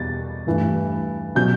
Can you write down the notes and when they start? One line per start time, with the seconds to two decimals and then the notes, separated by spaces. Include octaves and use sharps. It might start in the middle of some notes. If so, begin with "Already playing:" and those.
Already playing: E2 B2 G3 A6
0.47 G2 E3 A3
1.35 B2 F#3 C#4 G6